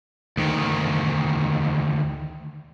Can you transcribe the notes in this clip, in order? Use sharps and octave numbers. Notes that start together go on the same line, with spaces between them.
D2 D#3